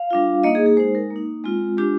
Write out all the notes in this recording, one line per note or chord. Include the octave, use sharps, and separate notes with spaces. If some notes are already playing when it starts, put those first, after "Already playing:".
Already playing: F5
G3 D4 F4
A#3 D#4 D#5
G#4
G#4
G#3 D#4 C5
A#4
A#3
D#4
G#3 C4 F4
G#3 D4 F4 G4